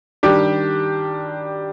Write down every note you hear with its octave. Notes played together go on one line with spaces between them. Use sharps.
D#3 G3 D4 G4